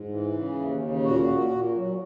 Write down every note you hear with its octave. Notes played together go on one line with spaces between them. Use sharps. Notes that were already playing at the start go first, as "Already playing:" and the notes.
Already playing: G#2
E3
C#3
D#2
C#3
A#2 F#4
A#2
A#2
F#3